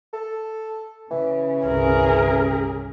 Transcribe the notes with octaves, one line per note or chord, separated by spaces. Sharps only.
A4
C#3 E3 C#4
G1 C2 G#4 A#4